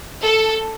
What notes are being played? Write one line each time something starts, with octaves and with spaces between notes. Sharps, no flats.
A4